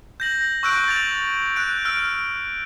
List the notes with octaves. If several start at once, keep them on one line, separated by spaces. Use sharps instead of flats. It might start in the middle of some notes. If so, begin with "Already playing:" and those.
G6 A#6 F#7
C#6 E6 F#6 G6 D7 F#7
A6 F7
F#6 D7
E6 F6 D7